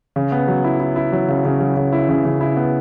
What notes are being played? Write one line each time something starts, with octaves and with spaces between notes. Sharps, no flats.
C#3
B3
F#3
E4
E4
E4
F#3
C#3
C#3
F#3
C#3
E4
C#3
C#3
E4
B3